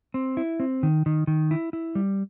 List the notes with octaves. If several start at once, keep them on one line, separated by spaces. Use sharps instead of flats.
C4
E4
C4
D#3
D#3
D#3
E4
E4
G3